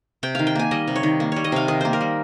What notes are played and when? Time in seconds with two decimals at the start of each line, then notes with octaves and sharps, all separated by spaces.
0.23 C3 G5
0.35 D#3 F5
0.47 G5
0.55 A#3 G#5
0.71 G3 D#5
0.88 C3
0.96 C#5
1.03 D#3
1.20 A#3
1.32 G3 C#5
1.44 D#5
1.52 C3 F5
1.68 D#3 D#5
1.81 A#3 C5
1.93 A#4
2.01 G3